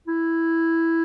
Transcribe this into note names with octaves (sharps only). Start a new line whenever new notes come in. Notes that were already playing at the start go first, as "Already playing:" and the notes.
E4